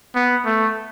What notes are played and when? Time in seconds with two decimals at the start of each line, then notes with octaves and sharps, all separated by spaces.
0.15 B3
0.46 A3